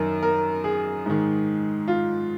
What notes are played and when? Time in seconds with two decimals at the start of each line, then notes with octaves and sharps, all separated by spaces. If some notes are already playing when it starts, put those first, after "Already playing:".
Already playing: F#2 D#3 A#4
0.22 A#4
0.64 G#4
1.06 G#2 D#3
1.88 F4